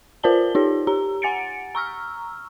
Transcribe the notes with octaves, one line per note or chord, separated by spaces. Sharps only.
F4 A#4 C5 D5 A5 G7
D#4 F4 G4 C#5
G4 A#5
F#5 G#5 A6 C#7 D7
A#5 C#6 E6 F6